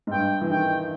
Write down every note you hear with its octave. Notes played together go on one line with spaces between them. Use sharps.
G#2
G2 G5
E3
D#3 G5